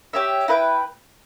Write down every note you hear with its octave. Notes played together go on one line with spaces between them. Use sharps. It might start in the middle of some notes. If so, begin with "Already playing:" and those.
G4 C#5 E5
E4 B4 E5 G5